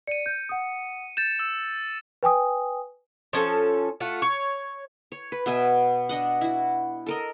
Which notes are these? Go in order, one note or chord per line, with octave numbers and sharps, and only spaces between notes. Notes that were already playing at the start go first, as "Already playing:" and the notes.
D5 C#7 D#7
G6
F#5 D#6
G6 A6 E7
E6
B4 G5 G#5 D#6
F3 C#4 A4
A3 F4 F#5
C#5
C#5
B4
B2 B3 E5 G#5
D4 D#5 F#5
E4 F#4
A4 A#4 D#5